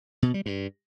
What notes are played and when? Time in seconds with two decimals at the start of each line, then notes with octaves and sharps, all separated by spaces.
0.23 B2
0.34 G3
0.46 G2